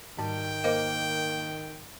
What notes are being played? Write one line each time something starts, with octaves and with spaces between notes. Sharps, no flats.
G#2 D#3 G3 G5
A#3 C5 D#5 F5 D6